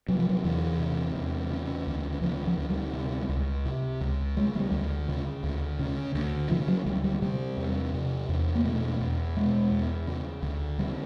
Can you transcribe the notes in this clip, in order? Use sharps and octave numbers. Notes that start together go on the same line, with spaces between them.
C3 F#3
F3
F#3
E2 E3
C3
E2
C#3
D2
C#3 F3
F3
D2
G3
C3
C#2
C3
C#2
C#3 G#3
G#3
G3
D2
C#3
D2
C#3
D2
C#3 F3
F#3
D2 G3
G3
C3 G3
E2
C3
E2
A#3
B2 A3
E2
B2 G#3
E2
C#3
D2
C#3 G3